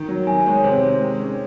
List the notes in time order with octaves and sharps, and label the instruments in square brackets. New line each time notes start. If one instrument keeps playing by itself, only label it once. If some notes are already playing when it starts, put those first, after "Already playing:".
Already playing: [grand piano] D#3
F#3
[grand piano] D#3 [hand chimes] G#5
[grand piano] G#3 [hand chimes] C#5
[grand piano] C3 [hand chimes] C5
[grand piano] D#3
G#3
C#4